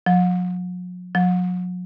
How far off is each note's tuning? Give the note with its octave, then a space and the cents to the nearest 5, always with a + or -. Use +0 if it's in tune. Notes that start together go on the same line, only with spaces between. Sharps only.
F#3 -45
F#3 -40